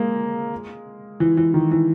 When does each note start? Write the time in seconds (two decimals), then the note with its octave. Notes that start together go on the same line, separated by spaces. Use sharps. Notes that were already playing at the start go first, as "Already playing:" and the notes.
Already playing: G#3 A#3
1.20 E3
1.37 E3
1.54 D#3
1.71 E3